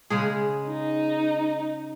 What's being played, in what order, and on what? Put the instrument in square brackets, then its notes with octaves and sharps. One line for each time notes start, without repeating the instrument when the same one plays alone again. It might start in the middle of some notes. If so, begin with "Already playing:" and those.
[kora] C#3 G#3 G#4
[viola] D#4